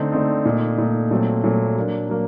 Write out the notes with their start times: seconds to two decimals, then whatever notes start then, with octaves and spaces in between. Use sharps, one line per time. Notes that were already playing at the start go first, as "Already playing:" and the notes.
Already playing: D3 A3 C4 D#4
0.12 D3 A3 C4 D#4
0.45 A#2 A3 D#4
0.78 A#2 A3 D#4
1.11 A#2 F#3 A3 C4
1.44 A#2 F#3 A3 C4
1.76 F#3 A#3 D4
2.09 F#3 A#3